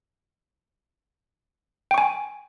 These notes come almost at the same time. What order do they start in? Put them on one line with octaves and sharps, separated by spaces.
G5 C#6 G#5